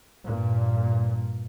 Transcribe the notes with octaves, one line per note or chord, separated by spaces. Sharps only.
G2 A#2